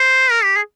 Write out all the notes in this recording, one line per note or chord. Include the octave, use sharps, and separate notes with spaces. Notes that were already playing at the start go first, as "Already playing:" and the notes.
Already playing: C5
A#4
G4
G#4